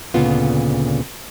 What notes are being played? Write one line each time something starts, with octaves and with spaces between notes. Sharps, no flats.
D2 A#2 C#3 B3 F4